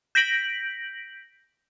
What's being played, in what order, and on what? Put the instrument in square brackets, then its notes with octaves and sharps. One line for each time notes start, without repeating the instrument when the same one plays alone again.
[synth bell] G6 A#6 B6 D7 F#7